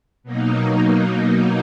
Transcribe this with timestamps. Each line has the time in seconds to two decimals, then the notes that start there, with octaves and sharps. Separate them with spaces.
0.24 B2 F#3 A#3 D#4